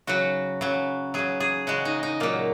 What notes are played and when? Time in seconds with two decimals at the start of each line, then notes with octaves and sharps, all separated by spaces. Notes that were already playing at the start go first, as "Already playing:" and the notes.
0.07 C#3 F#3 F#4
0.61 C#3 F#3
1.14 C#3 F#3 G#4
1.40 G#4
1.67 C#3 G#3 F#4
1.85 D#4
2.03 D#4
2.20 A#2 F#3 A#3